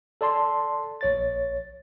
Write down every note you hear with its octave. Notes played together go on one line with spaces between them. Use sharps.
A4 D5 A5 C6
A#1 C#5 A6